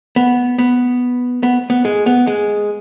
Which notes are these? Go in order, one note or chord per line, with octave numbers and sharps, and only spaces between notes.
B3
B3
B3
B3
G#3
B3
G#3